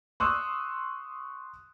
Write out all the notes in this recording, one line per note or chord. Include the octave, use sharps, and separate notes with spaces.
C6 C#6 D#6 E6 F#6